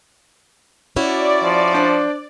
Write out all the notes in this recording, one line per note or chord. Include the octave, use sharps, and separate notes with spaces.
C#4 E4 F#4 D5
F3
D4 C5